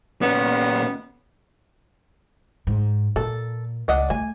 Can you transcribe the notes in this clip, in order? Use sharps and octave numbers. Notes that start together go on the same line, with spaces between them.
A#2 B3 C#4
G#2
A#2 A4
C#2 D4 D#5 F#5
A3 G#5